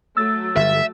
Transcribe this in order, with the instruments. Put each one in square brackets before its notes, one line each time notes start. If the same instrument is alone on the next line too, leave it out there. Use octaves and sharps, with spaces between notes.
[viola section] F#3 A3 [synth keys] E6 A6
[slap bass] G1 [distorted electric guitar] E5